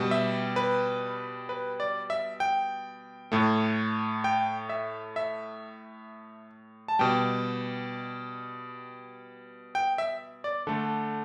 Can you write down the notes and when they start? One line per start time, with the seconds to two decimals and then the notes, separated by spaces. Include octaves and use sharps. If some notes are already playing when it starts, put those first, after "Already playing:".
Already playing: B2 G3
0.11 E5
0.56 B4
1.49 B4
1.80 D5
2.10 E5
2.40 G5
3.32 A2 A3
4.24 G5
4.69 E5
5.16 E5
6.88 A5
6.99 B2 G3 G5
9.75 G5
9.98 E5
10.44 D5
10.67 D3 A3 A4